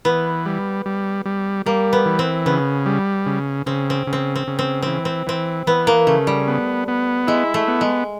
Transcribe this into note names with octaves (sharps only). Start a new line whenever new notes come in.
E3 B3
G3
G3
G3
G3 A#3
B3
E3
C4
C#3 B3
G3
C#3
C#3 C4
C4
C#3
C4
C4
C#3
C4
E3 C4
C4
E3 C4
E3 B3
A#3
C#3 A3
G3
B3
B3
G#3 E4
A3
B3
G#3